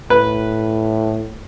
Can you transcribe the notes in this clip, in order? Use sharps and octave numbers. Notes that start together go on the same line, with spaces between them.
A2 B4